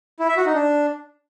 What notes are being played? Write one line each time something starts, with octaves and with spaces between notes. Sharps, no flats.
E4
E5
F#4
D#4
D4